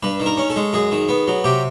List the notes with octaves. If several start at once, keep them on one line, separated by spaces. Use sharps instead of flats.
G2 B4
D#3
A#4
C#4
A4
G#3
F#2 G#4
D#3
B3
F#3
C3 G4